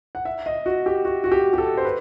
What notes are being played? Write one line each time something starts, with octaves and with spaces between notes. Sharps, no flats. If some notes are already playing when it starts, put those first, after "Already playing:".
F#5
E5
D#5
F#4
G4
F#4
F#4
G4
G4
A4
C5
B4